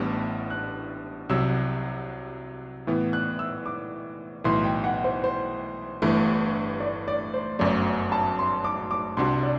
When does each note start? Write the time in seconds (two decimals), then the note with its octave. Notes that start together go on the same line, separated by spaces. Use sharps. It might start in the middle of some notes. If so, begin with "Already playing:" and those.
Already playing: A1 A2 G3 B3 D4
0.50 F#6
1.29 C2 C3 F#3 E6
2.87 A2 E3 B3
3.13 F#6
3.39 E6
3.66 D6
4.44 B1 A2 E3 C6
4.64 G5
4.84 F#5
5.04 C5
5.24 C5
6.02 G1 G2 E3 A3
6.80 D5
7.08 D5
7.34 C5
7.59 G1 F#2 F#3 A3 D5
8.12 A5
8.39 C6
8.64 D6
8.91 D6
9.17 C2 C3 G3 D4 F#4 C6
9.43 D5